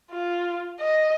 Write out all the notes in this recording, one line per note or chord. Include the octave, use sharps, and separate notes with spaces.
F4
D#5